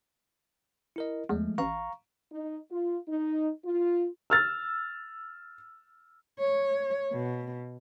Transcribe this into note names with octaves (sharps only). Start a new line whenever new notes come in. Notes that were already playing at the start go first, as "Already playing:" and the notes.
E4 A#4 D#5
E2 F3 G#3 A3
A1 F5 A#5 C#6
D#4
F4
D#4
F4
E6 F6 A6
C#5
B2